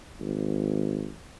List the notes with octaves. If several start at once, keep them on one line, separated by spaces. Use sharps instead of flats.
G#1